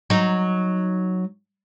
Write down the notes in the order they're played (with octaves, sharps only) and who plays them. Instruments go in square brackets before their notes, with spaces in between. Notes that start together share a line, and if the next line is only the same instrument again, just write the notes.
[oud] F#3 D#4